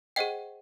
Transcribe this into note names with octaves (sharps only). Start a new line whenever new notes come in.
G#4 C5 D#5 F#5 G5